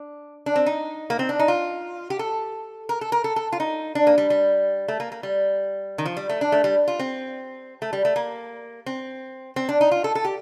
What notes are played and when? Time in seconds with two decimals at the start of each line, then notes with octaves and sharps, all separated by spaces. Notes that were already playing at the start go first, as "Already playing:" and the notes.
Already playing: D4
0.46 D4
0.56 C4
0.66 D#4
1.10 A#3
1.19 C4
1.29 D4
1.39 D#4
1.48 F4
2.10 G4
2.19 A4
2.89 A#4
3.01 A4
3.12 A#4
3.24 A4
3.36 A4
3.52 F4
3.60 D#4
3.95 D4
4.07 A#3
4.18 G3
4.30 G3
4.88 A3
5.00 A#3
5.12 A#3
5.23 G3
5.98 D#3
6.06 F3
6.17 G3
6.29 A3
6.41 D4
6.52 A3
6.64 G3
6.88 F4
6.99 C4
7.82 A3
7.93 G3
8.05 A3
8.16 A#3
8.86 C4
9.56 C4
9.69 D4
9.81 D#4
9.91 F4
10.04 A4
10.15 A4
10.25 G4